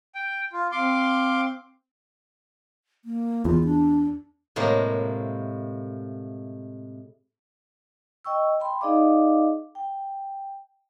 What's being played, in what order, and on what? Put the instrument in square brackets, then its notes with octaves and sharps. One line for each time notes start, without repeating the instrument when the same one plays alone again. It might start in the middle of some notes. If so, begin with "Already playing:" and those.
[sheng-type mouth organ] G5
F4
[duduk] C4 [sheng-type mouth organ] F5 C6 D6
[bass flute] A#3
[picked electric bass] E2 [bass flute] F4
[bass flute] D4
[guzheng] A2 C3 G#3 A#3
[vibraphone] D#5 G5 C#6 E6
G5 B5 C6
D#4 G#4 D5 D#5 F5 D6
G5